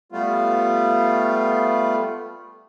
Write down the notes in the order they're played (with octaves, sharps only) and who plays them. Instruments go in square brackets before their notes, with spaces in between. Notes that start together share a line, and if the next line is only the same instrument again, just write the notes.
[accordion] G3 A3 B3 F4